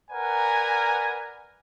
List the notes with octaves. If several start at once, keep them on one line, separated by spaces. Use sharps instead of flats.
A#4 B4 D5 F#5 G#5 A#5